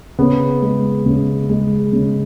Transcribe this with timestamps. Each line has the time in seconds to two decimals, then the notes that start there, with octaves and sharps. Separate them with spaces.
0.19 C#3 B3
0.62 G#3
1.06 C#3
1.49 G#3
1.93 C#3